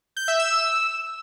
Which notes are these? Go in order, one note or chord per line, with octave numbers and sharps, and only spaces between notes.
G6
E5
E6